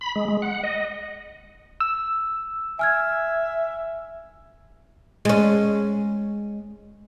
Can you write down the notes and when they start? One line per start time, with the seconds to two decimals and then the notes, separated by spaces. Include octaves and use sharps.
0.01 B5
0.16 G#3
0.28 G#3
0.42 F#5
0.63 D#5
1.80 E6
2.79 E5 G#5 F6 G#6
5.25 G#3 C#4